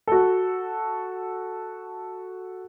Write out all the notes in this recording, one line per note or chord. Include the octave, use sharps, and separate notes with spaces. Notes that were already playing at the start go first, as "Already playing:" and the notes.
F#4 A4